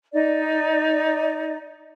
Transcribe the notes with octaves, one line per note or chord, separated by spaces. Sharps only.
D#4 D5